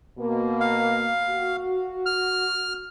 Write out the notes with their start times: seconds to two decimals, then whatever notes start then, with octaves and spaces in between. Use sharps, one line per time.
0.18 B2 A#3
0.60 F5
1.30 F#4
2.06 F6